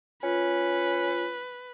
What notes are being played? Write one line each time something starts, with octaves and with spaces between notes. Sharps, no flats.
C#4 F4 B4